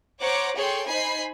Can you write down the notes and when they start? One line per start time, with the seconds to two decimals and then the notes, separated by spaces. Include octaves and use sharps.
0.20 C5 C#5 F#5 A#5 D6
0.55 G#4 A4 C#5 G5 C6
0.88 D#4 C5 G#5 B5 C7